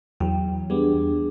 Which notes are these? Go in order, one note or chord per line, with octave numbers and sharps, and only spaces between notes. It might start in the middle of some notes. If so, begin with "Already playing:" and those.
E2 F#3 G5
G3 B3 D4 G#4